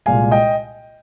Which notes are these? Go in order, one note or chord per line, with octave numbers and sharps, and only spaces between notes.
C2 A#2 G#3 F5 G#5
D#5 G5